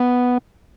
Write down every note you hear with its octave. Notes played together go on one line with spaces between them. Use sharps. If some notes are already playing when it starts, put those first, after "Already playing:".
Already playing: B3